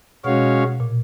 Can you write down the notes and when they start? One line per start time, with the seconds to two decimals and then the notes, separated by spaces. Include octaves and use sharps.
0.24 B2 G#3 C#4 F#4 C#5 F5
0.80 A#2